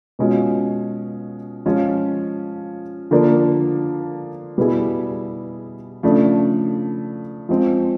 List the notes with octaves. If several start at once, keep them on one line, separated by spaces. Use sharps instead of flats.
B2 G#3 C#4 F4
F3 G#3 C#4 F4
D3 F3 A#3 D4
B2 G3 B3 E4 G#4
C#3 F3 A3 D4
F3 G#3 C4